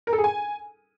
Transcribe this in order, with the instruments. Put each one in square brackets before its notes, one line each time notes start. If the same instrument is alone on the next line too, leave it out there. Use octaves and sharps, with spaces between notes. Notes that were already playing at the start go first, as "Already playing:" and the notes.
[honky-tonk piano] A#4
A4
G#4
G#5